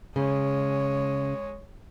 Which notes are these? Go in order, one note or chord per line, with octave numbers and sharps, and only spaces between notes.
C#3 G#3 C#5